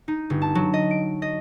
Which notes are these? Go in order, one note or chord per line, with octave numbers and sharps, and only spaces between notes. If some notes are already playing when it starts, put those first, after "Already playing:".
D#4
G1
A5
F#3
D#5
D7
D#5